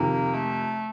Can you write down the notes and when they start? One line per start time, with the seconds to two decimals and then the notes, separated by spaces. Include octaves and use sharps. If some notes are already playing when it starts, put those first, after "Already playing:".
Already playing: F2 C3 D#3 A#3
0.34 A3